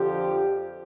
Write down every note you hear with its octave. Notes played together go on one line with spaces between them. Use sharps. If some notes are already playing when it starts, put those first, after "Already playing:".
Already playing: F2 D3 F3 G4